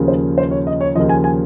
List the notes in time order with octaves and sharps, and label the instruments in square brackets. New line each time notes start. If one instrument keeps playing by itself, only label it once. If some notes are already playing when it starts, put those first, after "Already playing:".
Already playing: [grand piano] D#2 C#3 F3
C5
C5
C#5
D#5
C#5
D#2 C#3 F3 D#5
G#5
G#5